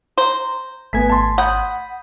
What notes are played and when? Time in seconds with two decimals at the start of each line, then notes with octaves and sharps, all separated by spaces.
0.18 C5 A#5
0.93 G#1 A3 B3 G#5 G#6 B6
1.10 A5 C6
1.38 F#5 B5 D#6 G6